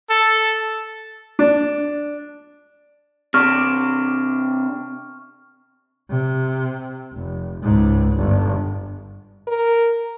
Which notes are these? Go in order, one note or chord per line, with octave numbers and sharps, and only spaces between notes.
A4
D4
C3 D4 C#6 F6
C3
F1
C#2 G#2
G1
A#4